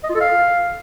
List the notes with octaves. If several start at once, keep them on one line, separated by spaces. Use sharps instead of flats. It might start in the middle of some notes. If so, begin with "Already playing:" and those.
D#5
F4
A4
F5